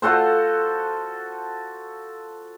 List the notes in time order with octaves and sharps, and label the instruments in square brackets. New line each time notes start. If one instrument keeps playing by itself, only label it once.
[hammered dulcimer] F4 F#4 A4 C5